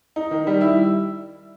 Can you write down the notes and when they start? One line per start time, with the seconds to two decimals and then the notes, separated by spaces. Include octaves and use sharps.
0.16 D#4
0.31 D#3
0.47 G3
0.61 E4